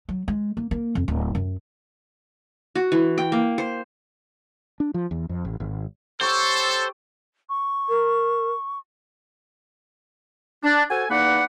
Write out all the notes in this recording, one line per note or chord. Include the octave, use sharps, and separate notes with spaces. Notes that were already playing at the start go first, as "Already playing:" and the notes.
F#3
G#3
A#3
A#3
F2
D1
F#2
F#4
E3
G5
A#3
C5
D4
F3
E2
F2
A1
G#1
G4 A4 C5 C#5 G5
C#6
A#4
D4
F#4 A4 C5 G#5
E2 A#3 D#4 B4 D5 F#5